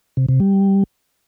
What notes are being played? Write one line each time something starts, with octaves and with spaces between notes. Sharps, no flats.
C3
C3
G3